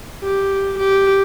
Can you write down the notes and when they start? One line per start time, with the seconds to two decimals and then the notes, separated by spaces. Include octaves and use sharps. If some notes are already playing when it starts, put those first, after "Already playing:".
0.24 G4
0.79 G4